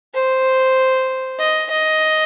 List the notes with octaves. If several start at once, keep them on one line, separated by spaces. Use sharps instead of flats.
C5
D#5
D#5